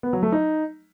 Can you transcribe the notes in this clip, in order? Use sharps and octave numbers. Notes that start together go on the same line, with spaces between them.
B3
F#3
A3
D#4